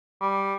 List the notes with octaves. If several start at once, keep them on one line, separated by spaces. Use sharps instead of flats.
G3